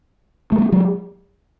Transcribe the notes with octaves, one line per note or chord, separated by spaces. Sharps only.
A3
G#3 A#3
F#3 G#3